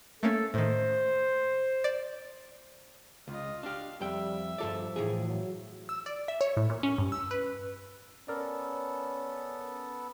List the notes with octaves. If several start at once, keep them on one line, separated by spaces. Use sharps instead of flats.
A3 A#3 C#4 A4
A2 D#3 C5
D5
C#2 F4 D#5
D4 G4 F5
F2 G3 E5 G5
G2 F3 A4 D5
A2 E3 G#4
F#3
E6
D5
E5
C#5
A2
A#2
C#4
G2
E6
B4
B3 C#4 A4 A#4 D5